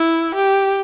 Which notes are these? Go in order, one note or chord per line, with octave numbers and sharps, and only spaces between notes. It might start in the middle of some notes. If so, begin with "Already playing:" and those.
Already playing: E4
G4